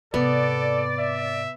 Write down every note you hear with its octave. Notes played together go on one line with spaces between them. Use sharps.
G#2 C3 B3 A4 D5
E5